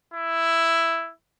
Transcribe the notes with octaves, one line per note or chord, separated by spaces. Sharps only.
E4